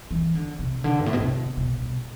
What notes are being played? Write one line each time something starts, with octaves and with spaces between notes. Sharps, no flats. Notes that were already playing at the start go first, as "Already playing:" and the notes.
E3
D3
C3
D3
G2
A2
B2
C3
B2
B2